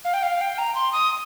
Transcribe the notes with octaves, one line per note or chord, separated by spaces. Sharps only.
F5
G5
F5
G5
A#5
C6
D#6